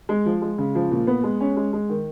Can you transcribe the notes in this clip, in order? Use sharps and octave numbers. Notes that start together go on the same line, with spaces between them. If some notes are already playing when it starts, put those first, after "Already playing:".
G#3
F3
G#3
C#3
F3
A#2
B3
G#3
C#4
G#3
G#3
D#3